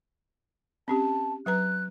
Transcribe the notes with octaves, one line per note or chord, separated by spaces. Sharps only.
C4 C#4 G4 A5
F#3 B4 A#5 F#6